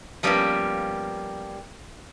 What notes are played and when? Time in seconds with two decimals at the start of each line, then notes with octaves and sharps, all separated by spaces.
0.23 F3 G3 A#3 B3 C#4 G4